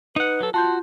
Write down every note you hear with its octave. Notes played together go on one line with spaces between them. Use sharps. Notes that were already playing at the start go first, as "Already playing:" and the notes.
D#4 B4 F#5
F#3 A4
F4 F#4 A5 C6 G6